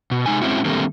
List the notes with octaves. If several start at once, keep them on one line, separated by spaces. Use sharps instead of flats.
B2
C3 G#3 D#4 G#5
G#3 C4 C#4 E4 F#4
D3 D#3 G3 A3 A#3 C4